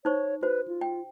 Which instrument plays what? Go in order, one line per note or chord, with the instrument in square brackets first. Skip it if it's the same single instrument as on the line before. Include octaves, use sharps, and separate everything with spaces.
[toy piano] D#4 C5 C#6 [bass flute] C#5
[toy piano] F#4 C5 [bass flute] B4
[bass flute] F4
[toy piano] G5